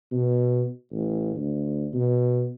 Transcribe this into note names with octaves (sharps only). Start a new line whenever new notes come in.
B2
A1
D2
B2